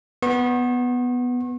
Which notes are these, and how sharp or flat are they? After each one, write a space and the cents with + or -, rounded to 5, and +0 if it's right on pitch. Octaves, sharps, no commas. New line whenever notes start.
B3 +0 C#6 -45